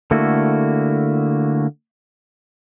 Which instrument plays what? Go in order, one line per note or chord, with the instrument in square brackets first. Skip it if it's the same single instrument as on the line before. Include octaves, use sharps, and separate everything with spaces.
[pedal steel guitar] D3 A3 A#3 E4 F#4